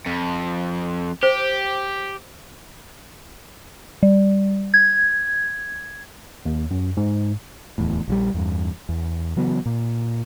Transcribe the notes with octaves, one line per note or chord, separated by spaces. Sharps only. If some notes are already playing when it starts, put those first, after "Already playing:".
F2
G4 C5
G3
G#6
D#2
F#2
G#2
D1 E2 A2
A#1 F3 G3
E2 G2
E2
C#3 E3 F#3 B3
A#2